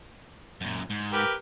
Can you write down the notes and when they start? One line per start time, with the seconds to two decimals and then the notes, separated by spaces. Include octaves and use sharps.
0.61 F#2 A#2
0.90 G#2
1.13 G4 A#4 B4